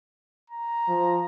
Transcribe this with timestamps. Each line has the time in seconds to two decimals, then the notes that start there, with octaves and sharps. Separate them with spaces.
0.50 A#5
0.88 F3